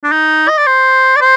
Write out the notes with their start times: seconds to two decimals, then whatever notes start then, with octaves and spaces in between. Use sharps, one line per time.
0.04 D4
0.12 D#4
0.48 D#5
0.58 D5
0.67 C5
1.16 D5
1.21 C5